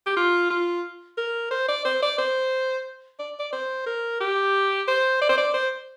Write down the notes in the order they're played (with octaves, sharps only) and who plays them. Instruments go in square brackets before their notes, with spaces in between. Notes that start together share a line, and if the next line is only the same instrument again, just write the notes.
[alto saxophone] G4
F4
F4
A#4
C5
D5
C5
D5
C5
D5
D5
C5
A#4
G4
C5
D5
C5
D5
C5